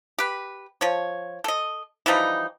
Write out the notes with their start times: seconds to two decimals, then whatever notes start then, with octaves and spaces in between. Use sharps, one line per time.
0.18 G4 B4
0.81 F3 C#5
1.44 A4 D#5
2.06 E3 F3 G3 D#4